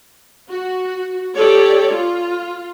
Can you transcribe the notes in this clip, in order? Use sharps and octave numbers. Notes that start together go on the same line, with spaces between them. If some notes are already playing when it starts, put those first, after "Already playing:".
F#4
G4 A4 C#5 D5
F4